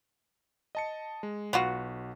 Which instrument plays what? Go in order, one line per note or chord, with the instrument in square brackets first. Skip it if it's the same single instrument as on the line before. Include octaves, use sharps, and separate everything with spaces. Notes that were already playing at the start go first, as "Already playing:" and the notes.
[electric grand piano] D#5 A5 C#7
G#3
[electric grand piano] B1 [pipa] B3 F4 F#4